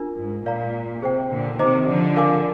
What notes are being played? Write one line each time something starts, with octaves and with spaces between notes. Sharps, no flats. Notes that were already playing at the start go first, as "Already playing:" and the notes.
Already playing: D4 F4 A#4
G#2
A#2 A#4 D5 F5 A#5
C3 G#4 C5 G5
A#2 D3
C3 D#3 C5 D#5 A#5 D6
D3 F3
A#4 D5 F5 G#5 D6